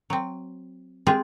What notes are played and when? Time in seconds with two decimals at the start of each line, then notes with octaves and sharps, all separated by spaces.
0.10 F#3 C4
1.07 G#3 C4 F4 G4 G#4